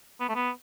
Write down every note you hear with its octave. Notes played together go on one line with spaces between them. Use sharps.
B3
A3
B3